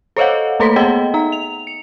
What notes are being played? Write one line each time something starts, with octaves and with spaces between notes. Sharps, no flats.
A4 C5 C#5 D#5 F5 F#5
A3 A#3 A4 C#5 C6 B6
B3 G#4 D#5 F#5 G5
D#4 A#5
F7
C#7